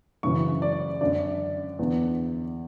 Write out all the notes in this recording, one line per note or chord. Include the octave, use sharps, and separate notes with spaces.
F#2 C#3 E3 C#6
D5
F#2 D3 D5
E2 D3